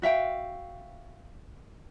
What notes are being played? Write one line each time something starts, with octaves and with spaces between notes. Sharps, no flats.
F#4 E5 F5 G5